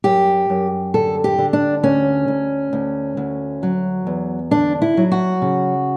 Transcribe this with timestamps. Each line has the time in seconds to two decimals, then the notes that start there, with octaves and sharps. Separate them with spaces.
0.04 F#2 G4
0.50 F#2
0.94 D3 A4
1.24 G4
1.38 D3
1.53 D4
1.83 D2 C#4
2.28 D2
2.73 D2
3.17 D2
3.63 F#3
4.07 E2
4.51 D3 D4
4.82 E4
4.97 F#3
5.12 F#4
5.42 C#3